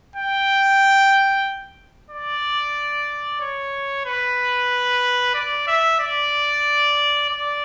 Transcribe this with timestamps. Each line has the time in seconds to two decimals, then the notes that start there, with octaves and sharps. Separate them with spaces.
0.16 G5
2.10 D5
3.41 C#5
4.06 B4
5.34 D5
5.67 E5
6.00 D5
7.29 D5